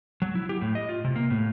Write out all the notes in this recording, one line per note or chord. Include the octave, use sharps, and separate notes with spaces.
F#3
E4
G4
A2
D#5
F4
C3
A#3
A2